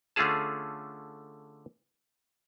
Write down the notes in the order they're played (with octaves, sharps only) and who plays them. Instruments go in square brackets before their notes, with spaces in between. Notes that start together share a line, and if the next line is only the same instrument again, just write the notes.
[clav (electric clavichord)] D3 A3 C#4 F4 G#4 A5